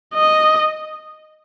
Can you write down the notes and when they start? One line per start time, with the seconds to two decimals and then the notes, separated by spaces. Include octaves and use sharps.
0.14 D#5